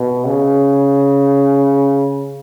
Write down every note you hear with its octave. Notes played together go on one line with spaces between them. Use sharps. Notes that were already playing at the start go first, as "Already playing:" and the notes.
Already playing: B2
C#3